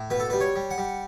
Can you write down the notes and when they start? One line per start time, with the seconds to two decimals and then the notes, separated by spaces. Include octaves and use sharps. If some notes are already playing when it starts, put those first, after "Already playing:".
Already playing: A2
0.10 B2 B4
0.20 A4
0.30 G3 B4
0.41 C#5
0.56 G3
0.71 F#5
0.78 G3